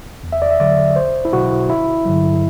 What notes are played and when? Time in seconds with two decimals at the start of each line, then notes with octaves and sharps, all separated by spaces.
0.23 E2
0.32 E5
0.42 D5
0.51 E5
0.60 D3 F#3 D5
0.96 B1 C5
1.25 E4
1.33 B2 F#3 F#4
1.69 G1 E4
2.06 G2 D3 F#3